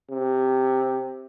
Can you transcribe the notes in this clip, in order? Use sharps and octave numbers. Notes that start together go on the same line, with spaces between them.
C3